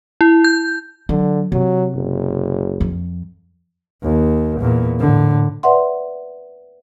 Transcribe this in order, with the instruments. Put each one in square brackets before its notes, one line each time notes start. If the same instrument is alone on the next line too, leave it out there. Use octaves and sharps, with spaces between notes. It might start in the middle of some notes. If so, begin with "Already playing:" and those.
[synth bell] E4
G6
[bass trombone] D3 [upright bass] F#3
[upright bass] C3 [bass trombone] F#3
[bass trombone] F#1
[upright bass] F2
[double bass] D#2
E2 A#2
A2 D3
[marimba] B4 D5 E5 F#5 C6